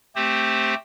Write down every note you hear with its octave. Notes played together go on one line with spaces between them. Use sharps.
A3 C4 G4 C5